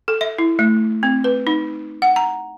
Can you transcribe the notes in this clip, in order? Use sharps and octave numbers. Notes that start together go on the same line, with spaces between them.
A4
E5
E4
A3
C4
B4
D#4
F#5
A#5